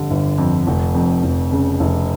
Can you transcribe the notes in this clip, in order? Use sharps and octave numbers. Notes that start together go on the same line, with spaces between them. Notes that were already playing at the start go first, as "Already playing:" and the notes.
Already playing: G1 F2 D3 G3
G1
F2
F1
F2
F1
C#3
F1